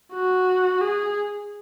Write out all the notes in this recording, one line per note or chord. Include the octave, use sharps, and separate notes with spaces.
F#4
G#4